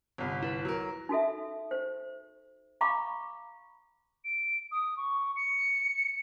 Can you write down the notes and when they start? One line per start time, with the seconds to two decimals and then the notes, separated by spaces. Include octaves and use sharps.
0.18 G1 C2
0.43 E4 B4
0.65 F#3 A#4
1.09 D#4 F#4 A4 E5
1.71 C5
2.81 F5 A#5 B5 C#6 D6
4.25 D7
4.72 D#6
4.97 C#6
5.36 C#7